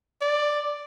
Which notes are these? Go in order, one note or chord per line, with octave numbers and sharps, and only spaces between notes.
D5